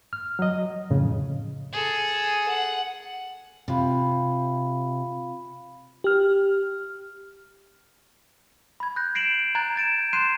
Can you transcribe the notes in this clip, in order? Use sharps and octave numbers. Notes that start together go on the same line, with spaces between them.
F6
F#3 D#5
F2 A2 C#3
G#4 A4
F#5
C3 F4 F5 B5
G4 F6
B5 G#6
F#6 G6 A#6
A#6 C7 D7 E7 F#7
A#5 F#6 G#6 A6
G6 A6 D7 E7
C6 F#6 G6 C7 D#7 E7